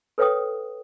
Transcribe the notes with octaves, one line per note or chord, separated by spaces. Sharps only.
A4 B4 C#5 F5 G5 D#6